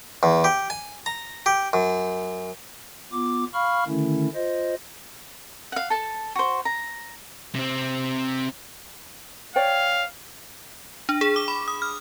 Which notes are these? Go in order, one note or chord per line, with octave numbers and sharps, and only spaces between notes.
E2
G4
G#5
A#5
G4
F#2
B3 F4 D6
F5 B5 C#6 F6
D3 D#3 A3 C#4 E4
F4 C5 D#5
F5 F#5
A4 A5
F#4 C5
A#5
C3 C4
C#5 D5 F5 G5
D4
G#4
D6
B5
D#6
F6